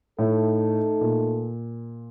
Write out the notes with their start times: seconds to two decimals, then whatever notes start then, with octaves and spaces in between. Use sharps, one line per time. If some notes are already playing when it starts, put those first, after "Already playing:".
0.19 A2 A3 D#4 A4
1.01 A#2